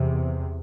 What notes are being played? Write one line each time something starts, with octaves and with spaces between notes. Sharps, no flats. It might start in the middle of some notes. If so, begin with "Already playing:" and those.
Already playing: E2 C3